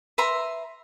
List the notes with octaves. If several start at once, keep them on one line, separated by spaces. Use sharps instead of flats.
B4 E5 A#5 C6